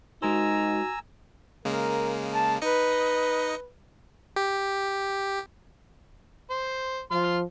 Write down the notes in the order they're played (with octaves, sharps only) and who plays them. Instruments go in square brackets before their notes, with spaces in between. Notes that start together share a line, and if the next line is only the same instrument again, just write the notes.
[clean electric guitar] G#3 A#4 C5 [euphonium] D#4 [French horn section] F#4 [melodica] G#5 A#5 E6
[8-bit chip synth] C#3 G#3 A#3 [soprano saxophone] A#4
[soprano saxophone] A5
[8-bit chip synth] D#4 D#5 C#7 [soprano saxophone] B4
[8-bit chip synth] G4
[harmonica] C5
[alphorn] F3 [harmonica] C6 F6